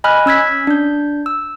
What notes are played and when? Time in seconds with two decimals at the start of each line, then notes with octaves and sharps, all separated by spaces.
0.04 D#5 G#5 B5 F6 F#6
0.26 C#4 E6 G#6 B6
0.67 D4 G6
1.26 E6